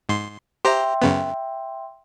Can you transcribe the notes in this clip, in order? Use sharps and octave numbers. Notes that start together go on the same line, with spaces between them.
G#2 C6
G4 C5 E5 G5 A#5 C6
F#2 C#3 B3